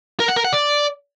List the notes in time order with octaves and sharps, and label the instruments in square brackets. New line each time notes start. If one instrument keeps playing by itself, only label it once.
[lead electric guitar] A#4
F#5
A#4
F#5
D5